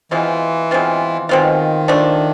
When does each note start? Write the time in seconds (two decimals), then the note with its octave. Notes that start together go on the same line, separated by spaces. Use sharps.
0.11 B2 E3 G#3 C4 F4
0.71 B2 G#3 C4 F4
1.29 B2 D#3 G#3 C4 F4
1.88 F3 A3 D4